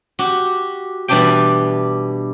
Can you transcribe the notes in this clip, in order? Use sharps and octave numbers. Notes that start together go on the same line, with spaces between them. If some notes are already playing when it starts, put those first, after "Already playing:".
F#4 G4
B2 E3 G3 D4 G4 G5